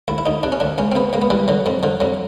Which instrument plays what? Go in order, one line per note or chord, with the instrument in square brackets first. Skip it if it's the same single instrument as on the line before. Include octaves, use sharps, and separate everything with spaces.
[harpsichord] D2 E4
E4
D2 D#4
C3 D4
C#4
D2 D4
C#2 C#4
C4
C#2 B3
C#2 A#3
B3
E3 G3
D3 F#3
F2 F3
D3 F3
F2 F#3